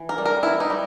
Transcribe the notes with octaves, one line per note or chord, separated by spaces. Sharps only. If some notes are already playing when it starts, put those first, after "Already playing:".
Already playing: E3
A#4
G3
A#4
B3 E4
D#4
G3